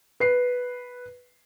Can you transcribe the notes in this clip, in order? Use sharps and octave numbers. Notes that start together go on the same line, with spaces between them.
B4 C7